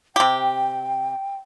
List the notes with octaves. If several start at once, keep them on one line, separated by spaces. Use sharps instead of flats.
C3 G4 G5